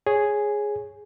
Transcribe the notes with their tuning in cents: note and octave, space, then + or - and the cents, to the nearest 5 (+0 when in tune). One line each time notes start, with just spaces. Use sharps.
G#4 +0 C#5 -10